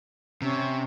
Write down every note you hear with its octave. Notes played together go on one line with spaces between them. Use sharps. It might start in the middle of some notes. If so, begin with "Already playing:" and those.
C3 C#4